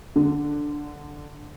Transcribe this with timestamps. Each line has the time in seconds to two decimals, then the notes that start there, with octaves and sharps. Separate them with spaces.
0.16 D3